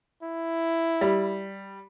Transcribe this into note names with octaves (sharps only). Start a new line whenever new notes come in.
E4
G3